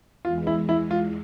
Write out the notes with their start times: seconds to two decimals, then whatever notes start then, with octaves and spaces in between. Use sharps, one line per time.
0.24 E2 E3 G#3 F4
0.47 E4
0.69 E4
0.91 F4